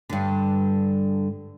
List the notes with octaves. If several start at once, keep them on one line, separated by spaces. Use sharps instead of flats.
G2 D3